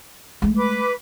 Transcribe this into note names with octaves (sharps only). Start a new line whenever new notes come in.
G#3 A3
B4 D6